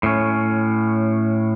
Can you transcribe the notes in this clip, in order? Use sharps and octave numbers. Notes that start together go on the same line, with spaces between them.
A2 C#4